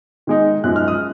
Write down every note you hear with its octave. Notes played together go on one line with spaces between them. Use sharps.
D#3 G#3 D#4
F#2 F3 G#3 D#4 F#6
F6
D#6